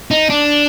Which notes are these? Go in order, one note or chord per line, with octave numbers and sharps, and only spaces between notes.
D#4
D4